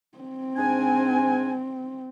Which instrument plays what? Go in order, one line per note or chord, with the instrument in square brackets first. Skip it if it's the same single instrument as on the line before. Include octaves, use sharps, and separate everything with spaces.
[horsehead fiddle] C4
[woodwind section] G#2 D4 G#5